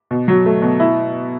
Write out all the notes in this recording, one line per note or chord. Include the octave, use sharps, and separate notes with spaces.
B2
F#3
A3
B2
E4